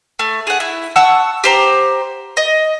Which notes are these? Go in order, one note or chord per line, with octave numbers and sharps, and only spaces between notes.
A3
G#4 F#5
E4
F#5 A5 C#6 E6
G4 C5 A#5
D#5